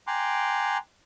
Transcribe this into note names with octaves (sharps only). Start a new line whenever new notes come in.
G5 G#5 A#5 C6 D6 F#6